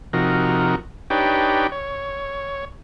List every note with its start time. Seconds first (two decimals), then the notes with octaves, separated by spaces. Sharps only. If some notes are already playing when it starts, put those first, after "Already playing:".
0.13 C3 F3 D#4 F#4 A#4
1.10 D4 D#4 G4 B4 C#5 G5
1.72 C#5